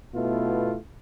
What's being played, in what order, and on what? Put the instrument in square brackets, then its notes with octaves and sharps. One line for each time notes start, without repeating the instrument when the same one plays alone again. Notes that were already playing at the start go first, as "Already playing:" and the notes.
[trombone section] B2 A3 B3 E4 F4